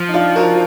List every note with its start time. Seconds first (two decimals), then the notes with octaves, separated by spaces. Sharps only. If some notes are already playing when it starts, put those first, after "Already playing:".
Already playing: F3
0.08 D#4
0.13 D4 F4
0.36 F#4 A#4